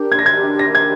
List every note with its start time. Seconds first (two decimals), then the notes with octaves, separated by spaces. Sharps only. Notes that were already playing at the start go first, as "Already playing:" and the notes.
Already playing: D4 G4 A#4
0.12 G#6
0.19 A#6
0.26 G#6
0.59 A#6
0.75 G#6